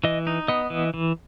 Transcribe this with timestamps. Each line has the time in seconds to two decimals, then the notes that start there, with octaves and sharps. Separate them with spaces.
0.04 E3 D#5
0.27 D#4
0.48 B3 D#5
0.70 E3
0.94 E3